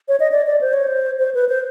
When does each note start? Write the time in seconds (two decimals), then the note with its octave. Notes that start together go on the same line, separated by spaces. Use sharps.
0.08 C#5
0.20 D#5
0.32 D5
0.46 D5
0.61 C5
0.73 C#5
0.87 C5
1.19 C5
1.35 B4
1.49 C5